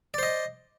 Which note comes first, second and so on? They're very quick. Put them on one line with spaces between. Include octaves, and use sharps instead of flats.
D5 C5 D#5